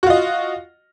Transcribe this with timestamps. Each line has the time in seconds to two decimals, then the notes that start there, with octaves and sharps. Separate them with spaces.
0.03 F#4
0.06 F4
0.10 D#5